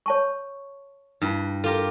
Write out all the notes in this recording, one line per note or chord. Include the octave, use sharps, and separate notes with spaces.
C#5 A5 C#6
G2 D#4 E4
F4 G4 A4 A#4